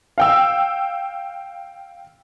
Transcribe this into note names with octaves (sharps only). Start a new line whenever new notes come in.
F5 G5 E6